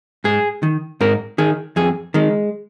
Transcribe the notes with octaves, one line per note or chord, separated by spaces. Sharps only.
G#2 G#4
D#3
G#2 A#4
D#3 G#4
F2 G#4
D#3 G#3